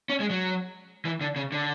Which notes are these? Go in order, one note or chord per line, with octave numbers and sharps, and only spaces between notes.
C#4
G#3
F#3
E3
D3
C#3
D3